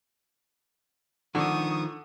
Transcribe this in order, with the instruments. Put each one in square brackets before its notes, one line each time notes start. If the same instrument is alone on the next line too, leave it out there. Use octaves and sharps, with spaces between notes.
[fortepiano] D3 [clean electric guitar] D#3 F3 [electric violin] C#6 D#6